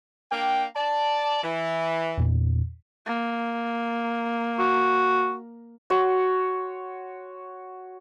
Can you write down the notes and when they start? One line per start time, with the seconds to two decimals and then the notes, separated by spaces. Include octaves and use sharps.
0.31 A#3 D4 G5
0.75 D5 A5
1.42 E3
2.18 E2 A#2
3.06 A#3
4.59 F#4
5.90 F#4 C#5 C6